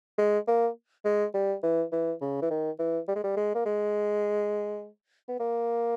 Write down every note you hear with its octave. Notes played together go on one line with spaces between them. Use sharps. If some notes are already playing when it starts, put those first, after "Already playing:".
G#3
A#3
G#3
G3
E3
E3
C#3
E3
D#3
E3
G3
G#3
G3
G#3
A#3
G#3
B3
A#3